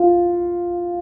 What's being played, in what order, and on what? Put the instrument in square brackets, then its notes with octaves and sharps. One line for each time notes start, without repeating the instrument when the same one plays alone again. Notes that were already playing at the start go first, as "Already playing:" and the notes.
Already playing: [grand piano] F4